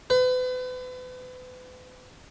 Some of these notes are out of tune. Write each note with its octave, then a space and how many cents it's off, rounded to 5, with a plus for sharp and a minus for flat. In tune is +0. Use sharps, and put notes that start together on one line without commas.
B4 +40